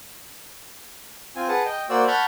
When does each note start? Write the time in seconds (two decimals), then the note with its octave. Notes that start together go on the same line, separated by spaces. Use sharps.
1.36 C4 F4 G#5
1.48 G#4 B4 F#5 A5
1.65 D#5 G5
1.90 A#3 F#4 C5 D5 E6
2.08 F#5 A5 B5 C#6 F6 G6